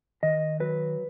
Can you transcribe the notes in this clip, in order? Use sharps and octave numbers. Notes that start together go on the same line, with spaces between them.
D#3 D#5
F#3 B4